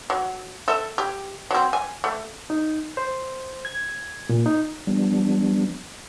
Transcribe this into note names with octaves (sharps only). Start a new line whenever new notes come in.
F#3
A4 E5
G4
F#3 C4
G#5
A3
D#4
C5
G#6
A#2
D#4
F3 G3 B3 D4